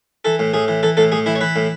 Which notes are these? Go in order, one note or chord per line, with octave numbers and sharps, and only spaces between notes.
E3 A4
A2
A2 G#4
E3
E3 A4
A2 A4
A2 G#4
E3 E4
C#5
E3 B4
A2